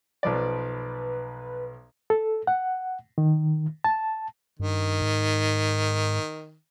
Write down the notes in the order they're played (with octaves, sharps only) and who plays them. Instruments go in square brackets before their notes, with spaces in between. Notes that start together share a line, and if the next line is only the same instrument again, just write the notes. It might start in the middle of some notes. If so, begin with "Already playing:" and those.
[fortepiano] B1 F3 D5 [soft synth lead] B4
[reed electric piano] A4
F#5
D#3
A5
[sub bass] G2 [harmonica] D#3
[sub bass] G#2